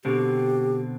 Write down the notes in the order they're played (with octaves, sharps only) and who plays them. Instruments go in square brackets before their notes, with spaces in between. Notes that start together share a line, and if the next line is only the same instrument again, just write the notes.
[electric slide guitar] B2 D3 C4 [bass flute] G4